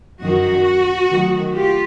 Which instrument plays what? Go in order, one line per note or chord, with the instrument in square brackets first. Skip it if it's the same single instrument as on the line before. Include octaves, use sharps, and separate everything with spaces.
[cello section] F#2 D#3 F#3 F#4
D#3 F#3 A3
F4 G4